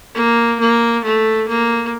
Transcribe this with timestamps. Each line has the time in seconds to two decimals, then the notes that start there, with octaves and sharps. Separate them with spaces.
0.15 A#3
0.60 A#3
1.04 A3
1.48 A#3